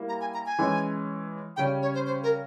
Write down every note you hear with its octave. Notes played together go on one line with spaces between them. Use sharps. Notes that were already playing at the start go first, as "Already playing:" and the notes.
Already playing: G3 A#3 E4
A#5
G#5
A#5
G#5
E3 G#3 C#4
C#3 G3 C#4 G5
C#5
C5
C5
A#4